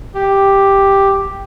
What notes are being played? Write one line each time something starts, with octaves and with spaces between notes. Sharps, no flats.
G4